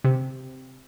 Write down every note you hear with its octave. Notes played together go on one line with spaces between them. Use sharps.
C3